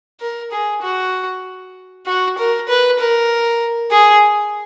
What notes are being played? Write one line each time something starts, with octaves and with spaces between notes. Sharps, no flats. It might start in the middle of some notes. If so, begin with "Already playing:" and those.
A#4
G#4
F#4
F#4
A#4
B4
A#4
G#4